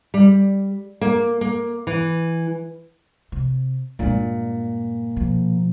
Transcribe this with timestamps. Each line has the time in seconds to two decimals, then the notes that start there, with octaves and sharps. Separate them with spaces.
0.14 G3
1.01 A#3
1.41 A#3
1.87 E3
3.32 C3
3.99 G2 A#2 G#3
5.16 B2 F3